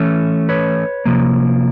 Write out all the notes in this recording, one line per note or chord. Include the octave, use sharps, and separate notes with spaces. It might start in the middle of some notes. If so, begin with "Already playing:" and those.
Already playing: E3 A3 C#4
B4 C#5
C3 F3 A#3